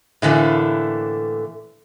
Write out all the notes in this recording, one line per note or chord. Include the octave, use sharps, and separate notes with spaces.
A2 D3 E3 A3 A#3